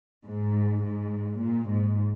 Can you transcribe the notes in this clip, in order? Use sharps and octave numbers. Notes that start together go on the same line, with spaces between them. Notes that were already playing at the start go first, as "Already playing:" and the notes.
G#2
G#2
A#2
G#2